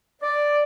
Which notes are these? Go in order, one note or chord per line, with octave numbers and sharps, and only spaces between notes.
D5